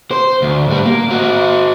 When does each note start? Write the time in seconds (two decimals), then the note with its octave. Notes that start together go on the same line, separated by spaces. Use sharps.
0.11 C5
0.42 D2
0.68 G#2 G3
0.85 A#3
1.10 C4 F#4